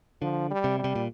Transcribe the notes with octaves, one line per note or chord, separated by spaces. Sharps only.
D3 F3
G3
C3
G3
C3
A#2